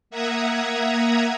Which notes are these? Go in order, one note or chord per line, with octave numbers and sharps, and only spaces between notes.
A#3 E5 F#5 A#5 D#6 G#6